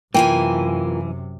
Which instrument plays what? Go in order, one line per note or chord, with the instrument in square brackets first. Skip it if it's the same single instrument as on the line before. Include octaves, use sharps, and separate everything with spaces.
[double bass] F#2 C3 [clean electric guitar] E3 [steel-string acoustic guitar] A#3 F4 G#5 [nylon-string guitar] G5